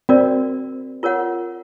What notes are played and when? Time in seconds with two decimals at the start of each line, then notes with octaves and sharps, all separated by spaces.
0.09 C4 C#4 F#4 A#4 D5
1.03 F4 A#4 C#5 F#5